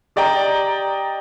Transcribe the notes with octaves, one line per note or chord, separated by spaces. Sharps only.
G4 D5 D#5 G5 A#5